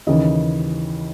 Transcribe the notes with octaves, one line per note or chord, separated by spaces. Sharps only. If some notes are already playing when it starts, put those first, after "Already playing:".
D#2 C#3 E3 D#5